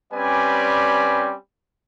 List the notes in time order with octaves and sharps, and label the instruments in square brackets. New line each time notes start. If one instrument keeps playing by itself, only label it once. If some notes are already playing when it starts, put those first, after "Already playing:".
[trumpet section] G3 C4 C#4 B4 D5 G#5